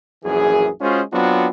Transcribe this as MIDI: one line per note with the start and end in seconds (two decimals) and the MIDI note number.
0.25 0.69 34
0.25 0.69 42
0.25 0.69 52
0.25 0.69 68
0.81 1.01 56
0.81 1.01 61
0.81 1.01 65
0.81 1.01 66
0.81 1.01 68
0.81 1.01 72
1.13 1.48 54
1.13 1.48 59
1.13 1.48 60
1.13 1.48 62
1.13 1.48 65
1.13 1.48 66